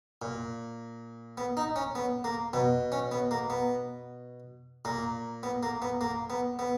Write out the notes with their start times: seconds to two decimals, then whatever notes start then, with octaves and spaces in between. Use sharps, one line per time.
0.22 A#2
1.38 B3
1.57 D#4
1.76 C#4
1.95 B3
2.24 A#3
2.53 B2 B3
2.92 C#4
3.12 B3
3.31 A#3
3.50 B3
4.85 A#2 A#3
5.43 B3
5.63 A#3
5.82 B3
6.01 A#3
6.30 B3
6.59 B3